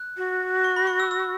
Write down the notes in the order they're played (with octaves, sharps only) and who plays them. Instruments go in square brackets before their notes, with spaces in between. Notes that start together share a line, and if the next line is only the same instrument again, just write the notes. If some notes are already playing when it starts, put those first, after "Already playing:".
Already playing: [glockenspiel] F#6
[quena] F#4
[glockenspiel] C#6
B5
C#6
E6
E6